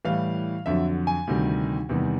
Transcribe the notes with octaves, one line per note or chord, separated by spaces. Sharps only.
A2 E3 G3 F5
F2 D3 F#3 E5
G#5
D2 C3 D#3 G3
E2 C3 D#3 G3